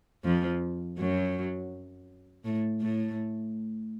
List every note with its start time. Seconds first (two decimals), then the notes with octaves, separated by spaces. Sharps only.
0.24 F2 F3
0.98 F#2 F#3
2.45 A2 A3
2.81 A2 A3